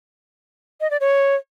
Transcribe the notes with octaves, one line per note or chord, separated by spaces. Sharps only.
D#5
D5
C#5